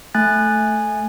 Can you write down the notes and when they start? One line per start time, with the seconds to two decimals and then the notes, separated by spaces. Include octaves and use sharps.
0.15 A3 G#5 F#6 A6